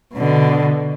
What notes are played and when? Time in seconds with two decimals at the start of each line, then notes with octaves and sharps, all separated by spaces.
0.14 B2 D3